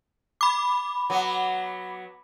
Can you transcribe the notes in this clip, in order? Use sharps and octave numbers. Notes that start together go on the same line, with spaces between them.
B5 D6
F#3 B3